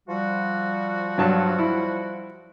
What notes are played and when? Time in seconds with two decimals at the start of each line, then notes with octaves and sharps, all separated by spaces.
0.09 F3 G3 F#4
1.18 G2 F#3 A5
1.58 E4